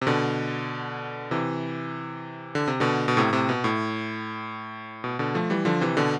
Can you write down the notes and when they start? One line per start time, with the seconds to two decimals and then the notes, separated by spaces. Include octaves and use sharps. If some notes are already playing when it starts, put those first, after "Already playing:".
0.02 C3
0.07 B2 D3
1.31 C3 E3
2.55 D3
2.68 C3
2.80 B2 D3
3.08 B2
3.17 A2 C3
3.32 A2 C3
3.49 B2
3.64 A2
5.04 B2
5.19 B2 D3
5.35 F3 A3
5.50 E3 G3
5.65 D3 F3
5.81 C3 E3
5.97 B2 D3